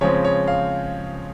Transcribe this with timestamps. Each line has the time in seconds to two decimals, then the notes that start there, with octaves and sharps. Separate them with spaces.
0.01 C#3 F3 G#3 C4 C#5
0.25 C#5
0.48 F5